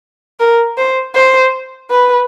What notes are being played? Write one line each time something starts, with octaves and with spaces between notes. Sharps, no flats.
A#4
C5
C5
B4